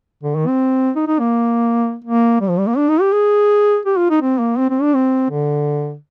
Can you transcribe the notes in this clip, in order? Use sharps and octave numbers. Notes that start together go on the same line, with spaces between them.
D3
D#3
C4
D#4
D#4
A#3
A#3
G3
F3
G3
A#3
D4
D#4
G4
G#4
G4
F4
D#4
C4
A#3
C4
C4
D4
C4
D3